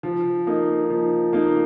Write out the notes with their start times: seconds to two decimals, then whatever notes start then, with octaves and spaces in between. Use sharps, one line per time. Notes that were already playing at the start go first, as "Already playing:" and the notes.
0.03 F3
0.47 A#3 D#4
0.90 F3
1.33 A#3 D#4